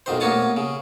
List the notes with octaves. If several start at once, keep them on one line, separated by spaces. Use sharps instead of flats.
B1 F2 D#3 C5
A1 A#3 B3 C#5 A5 D#6
C#3